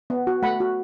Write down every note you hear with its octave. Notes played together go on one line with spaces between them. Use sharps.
B3
F#4
A3 F#5 B5
F#4